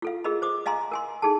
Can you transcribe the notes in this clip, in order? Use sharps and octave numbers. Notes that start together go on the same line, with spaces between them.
F4 A4 F5
F4 G#4 A#4 D#5 B5
C5 D6 D#6
D#5 F5 G#5 A#5 C6
A#4 G#5 C6
D#4 G#4 A4 A5